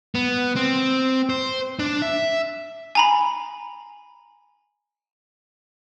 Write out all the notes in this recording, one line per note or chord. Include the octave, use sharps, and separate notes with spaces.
B3
C4
C5
D4
E5
G#5 A#5 B5